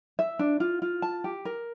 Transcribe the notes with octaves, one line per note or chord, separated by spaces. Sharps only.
E5
D4
F4
F4
A5
G4
A#4